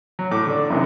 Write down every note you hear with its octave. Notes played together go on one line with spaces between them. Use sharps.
F#3
A2 D6
D3 D4
F#2 C3 D#3